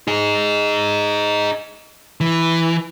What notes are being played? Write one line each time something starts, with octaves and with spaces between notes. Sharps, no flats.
D#4 G#4
E3